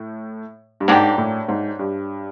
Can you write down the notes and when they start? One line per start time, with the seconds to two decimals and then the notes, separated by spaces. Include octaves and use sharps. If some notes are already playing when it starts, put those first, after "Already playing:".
Already playing: A2
0.80 G2
0.88 G#2 F#3 A#3 D4 G4
1.18 A2
1.48 G#2
1.79 G2